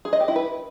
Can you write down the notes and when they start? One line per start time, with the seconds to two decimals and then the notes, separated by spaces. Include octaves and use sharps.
0.05 G#4
0.13 D#5
0.20 G4
0.28 E4
0.36 B4